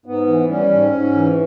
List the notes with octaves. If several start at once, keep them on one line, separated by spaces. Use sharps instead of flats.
G#2 B3
E3
G3 C#4
G#2
G#2
E3